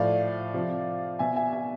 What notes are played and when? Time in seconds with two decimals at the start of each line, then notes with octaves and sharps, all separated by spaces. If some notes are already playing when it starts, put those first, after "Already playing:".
Already playing: A2 F3 D5 F5
0.54 C3 F3
1.19 B2 E5 G#5
1.36 E5 G#5
1.53 E5 G#5